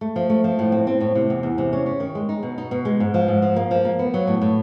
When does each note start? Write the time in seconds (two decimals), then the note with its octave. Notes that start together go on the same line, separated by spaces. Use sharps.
0.01 A3
0.16 F3
0.30 A3
0.44 F3
0.59 A2
0.72 C4
0.87 C4
1.01 A2
1.15 C3
1.30 E2
1.43 E2
1.58 C3
1.73 C#4
1.86 C#4
2.00 D#3
2.15 G#3
2.29 D#4
2.43 B2
2.58 D#4
2.71 B2
2.85 G#3
3.00 G#2
3.14 F3
3.28 G#2
3.42 F3
3.56 A#3
3.71 F3
3.85 A#3
3.99 B3
4.14 F#3
4.27 A2
4.42 A2